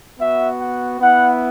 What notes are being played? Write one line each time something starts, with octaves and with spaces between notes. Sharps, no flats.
B3 F#4 E5
F#5
B3 E4 F#5